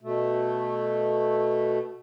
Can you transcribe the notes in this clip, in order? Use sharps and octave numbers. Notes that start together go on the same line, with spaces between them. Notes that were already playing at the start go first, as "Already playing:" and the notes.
B2 A3